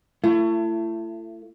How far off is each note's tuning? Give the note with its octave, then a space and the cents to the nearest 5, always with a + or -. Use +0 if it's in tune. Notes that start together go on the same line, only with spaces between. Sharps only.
A3 +20 E4 +40